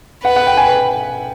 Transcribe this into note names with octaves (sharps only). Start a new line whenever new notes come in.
B4 F#5
F#5
G5
G#5